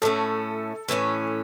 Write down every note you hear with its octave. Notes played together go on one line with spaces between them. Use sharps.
A2 E3 A3 C#4 A4
A2 E3 A3 C#4